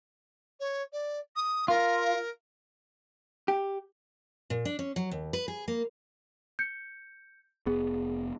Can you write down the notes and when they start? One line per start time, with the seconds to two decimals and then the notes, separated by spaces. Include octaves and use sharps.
0.59 C#5
0.92 D5
1.35 D#6
1.68 F4 A#4
3.48 G4
4.50 A#2
4.65 D4
4.79 C#4
4.96 F#3
5.11 D#2
5.33 B4
5.48 G#4
5.68 A#3
6.59 G6 C#7
7.66 F1 B3 G#4